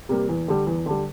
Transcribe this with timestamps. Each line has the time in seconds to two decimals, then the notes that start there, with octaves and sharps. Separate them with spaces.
0.09 C3 G3 A#3
0.29 E2
0.48 D3 G3
0.67 E2
0.86 D3 G3